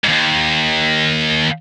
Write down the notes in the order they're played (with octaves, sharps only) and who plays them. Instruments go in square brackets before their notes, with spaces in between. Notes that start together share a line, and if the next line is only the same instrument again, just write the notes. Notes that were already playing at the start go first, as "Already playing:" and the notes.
[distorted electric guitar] D#2 G#2